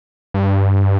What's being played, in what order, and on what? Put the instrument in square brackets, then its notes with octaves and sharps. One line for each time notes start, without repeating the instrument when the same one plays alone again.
[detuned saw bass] G2